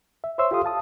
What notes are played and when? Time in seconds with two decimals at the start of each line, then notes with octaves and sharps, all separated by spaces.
0.24 E5
0.38 C5 C#5 E5 C6 E6
0.51 F4 G4 A4 F5 C6 D#6
0.64 F5 A5 D#6